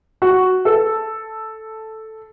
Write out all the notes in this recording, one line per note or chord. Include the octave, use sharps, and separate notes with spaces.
F#4
A4